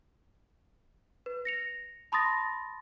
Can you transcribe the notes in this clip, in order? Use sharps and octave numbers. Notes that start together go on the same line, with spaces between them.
B4
A#6 C#7 F7
A5 B5 C6 D#6 A6 A#6